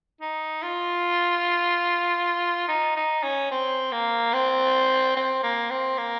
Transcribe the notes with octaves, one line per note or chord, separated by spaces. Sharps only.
D#4
F4
D#4
D#4
C#4
C4
A#3
C4
C4
A#3
C4
A#3